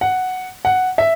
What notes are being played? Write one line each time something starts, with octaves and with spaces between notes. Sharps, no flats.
F#5
F#5
E5